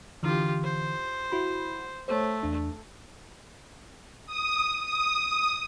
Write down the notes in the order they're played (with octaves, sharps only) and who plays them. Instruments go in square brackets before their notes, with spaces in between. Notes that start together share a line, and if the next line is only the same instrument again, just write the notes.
[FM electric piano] D3 E3 [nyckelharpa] F4 G4
[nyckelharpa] C5
[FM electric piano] E4 F#4 B5
[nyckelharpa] A3 [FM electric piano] C5 C#5
[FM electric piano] E2 D4
[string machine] D#6
D#6